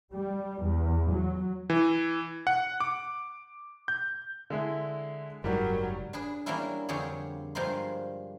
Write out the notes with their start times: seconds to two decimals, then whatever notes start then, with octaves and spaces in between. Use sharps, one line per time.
0.14 G3
0.64 E2
1.11 F#3
1.70 E3
2.47 F#5
2.80 D6
3.88 G6
4.50 D3 G#3 E4
5.44 F#1 G#2 F#3 G3 A#4
6.13 D4 G#4 B4
6.46 E3 G3 A#3 C#4 D4 E4
6.89 F2 D3 G3 G#4 C#5
7.55 G2 F3 G3 G#3 A#3 C5